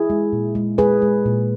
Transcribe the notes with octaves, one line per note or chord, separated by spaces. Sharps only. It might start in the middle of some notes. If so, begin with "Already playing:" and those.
Already playing: E4 G#4
G#3
A#2
G#3
G#3 G#4 B4
G#3
A#2